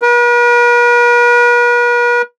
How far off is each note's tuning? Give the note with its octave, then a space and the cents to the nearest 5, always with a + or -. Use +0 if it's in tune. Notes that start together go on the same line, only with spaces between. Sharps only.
B4 -45